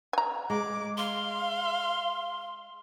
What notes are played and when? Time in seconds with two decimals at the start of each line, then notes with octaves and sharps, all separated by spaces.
0.13 G#5 A#5
0.50 G#3 D6
0.97 F5 C6